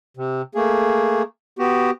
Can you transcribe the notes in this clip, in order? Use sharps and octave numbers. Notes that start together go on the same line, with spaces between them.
C3
A3 A#3 G#4
B3 F#4 G4